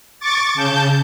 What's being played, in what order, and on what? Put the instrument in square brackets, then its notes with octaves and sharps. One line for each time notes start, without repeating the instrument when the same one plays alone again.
[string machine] C#6 D6 A6
C#3 A5 G6